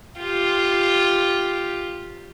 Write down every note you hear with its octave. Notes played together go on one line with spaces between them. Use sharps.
F4 G4